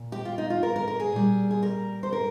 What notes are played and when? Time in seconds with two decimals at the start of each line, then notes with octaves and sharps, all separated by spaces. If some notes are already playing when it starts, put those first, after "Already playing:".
Already playing: A#2
0.12 G4
0.25 F4
0.38 D#4
0.50 F4
0.63 A#4
0.76 A#4
0.88 A#4
1.00 G#4
1.12 A#2 G3
1.51 G#4
1.63 A#4
2.03 C5
2.12 A#4